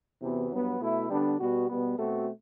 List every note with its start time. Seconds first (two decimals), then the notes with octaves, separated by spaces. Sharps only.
0.21 E2 C3 E3 B3 F#4
0.51 G2 F#3 B3
0.80 B2 A3 E4
1.10 D3 G3 B3 D4
1.39 B2 G3 B3 F#4
1.69 B2 G3 B3
1.98 B2 A3 C4 F#4 A4